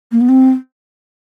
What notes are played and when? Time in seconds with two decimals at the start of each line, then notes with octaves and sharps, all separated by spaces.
0.12 A#3
0.21 B3
0.29 C4